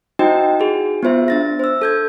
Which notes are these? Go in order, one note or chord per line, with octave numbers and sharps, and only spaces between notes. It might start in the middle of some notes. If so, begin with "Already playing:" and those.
D#4 E4 F#4 C5 D#5 G5
F#4 G#4
B3 F4 C5 E5
D4 A6 A#6
C5 E6
A4 G6 G#6